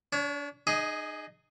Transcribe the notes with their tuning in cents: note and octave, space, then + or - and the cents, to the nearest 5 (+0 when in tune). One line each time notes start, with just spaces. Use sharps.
D4 -35 C#5 +15
D#4 -40 G#4 +0 D#5 +15